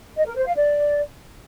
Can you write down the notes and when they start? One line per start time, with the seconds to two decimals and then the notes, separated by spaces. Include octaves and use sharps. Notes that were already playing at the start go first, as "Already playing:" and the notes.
0.17 D#5
0.27 A#4
0.36 C5
0.46 F5
0.56 D5